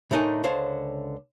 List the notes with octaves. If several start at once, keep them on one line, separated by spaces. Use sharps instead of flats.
A2 D3 A3 D#4 A#4 G#5
C#2 D3 C5 C#5 F5 A5